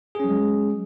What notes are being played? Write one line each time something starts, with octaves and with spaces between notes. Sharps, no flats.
F#3 G#3 C#4 G#4